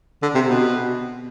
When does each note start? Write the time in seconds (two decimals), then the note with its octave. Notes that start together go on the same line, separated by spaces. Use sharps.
0.22 D3
0.35 C3
0.48 B2